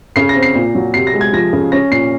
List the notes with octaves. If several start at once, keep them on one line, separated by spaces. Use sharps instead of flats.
C#3 C7
A#6
C4
C7
A#2
F#3
C3 C7
A#6
G#3
G#6
F3 A#6
C#3
C#4 A#6
A#2 C7